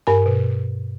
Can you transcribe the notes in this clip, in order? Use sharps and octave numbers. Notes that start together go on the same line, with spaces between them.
G2 A#4 G#5
B2